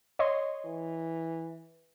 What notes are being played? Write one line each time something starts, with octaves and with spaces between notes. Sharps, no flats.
C#5 D#5 C6
E3